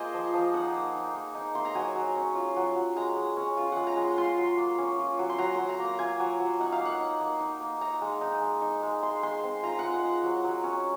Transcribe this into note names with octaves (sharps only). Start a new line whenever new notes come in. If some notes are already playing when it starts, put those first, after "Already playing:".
Already playing: A#3 F4 G#4 A#4 C5 D#5
F3
F3
D#4 F#5
A#3
D#4
A#3
D#4
A#3 C6
A#5
F#3 G#5
F#3
C#4
F4
F#3
F#3
G#3 A#5
G#3
C#4
F4
G#3 F#5
A#5
G#3
C6
F4 C6
F#3
A#3
C#4
F4
F#3
C6
F#3 A#5
F#3 C6
A#5
A#3 A#5
F4 G#5
F#3
F#3
D#4 F#5
F5
A#3 F#5
D#4
A#3
D#4
A#3
D#4 A#5
G#3
D#4
G#3
D#4
G#3
G#3 C6
G#3 C6
C4
F4 A#5
G#3 F#5
F#5
G#3
F#3
F#3
C#4